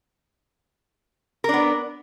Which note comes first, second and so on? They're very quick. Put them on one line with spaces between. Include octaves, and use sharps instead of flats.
A#4 D4 B3